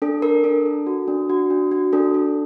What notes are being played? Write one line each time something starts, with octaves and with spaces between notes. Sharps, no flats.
D4 A4
D4 A#4
D4 A4
A4
F#4
D4
F#4
D4
F#4
D4 A4
A4